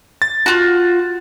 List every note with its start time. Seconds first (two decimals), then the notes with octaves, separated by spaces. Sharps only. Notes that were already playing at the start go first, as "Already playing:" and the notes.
0.22 A6
0.46 F4 F#4